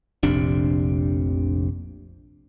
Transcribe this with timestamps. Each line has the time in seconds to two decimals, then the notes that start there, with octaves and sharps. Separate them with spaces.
0.23 F1 A#1 C3 D4